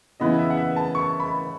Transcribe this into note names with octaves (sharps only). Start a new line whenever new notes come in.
C#3 E3 B3 E4 D#5
E5
F#5
E5
A5
C#6
B5